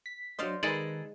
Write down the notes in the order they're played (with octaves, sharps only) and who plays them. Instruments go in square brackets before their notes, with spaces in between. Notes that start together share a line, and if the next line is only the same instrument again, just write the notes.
[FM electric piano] B6
[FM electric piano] F#3 D4 D#5 [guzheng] C5 D5 F5
[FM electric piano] D#3 D#4 B4 [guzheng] G#3 [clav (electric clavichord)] G#4 A4 D5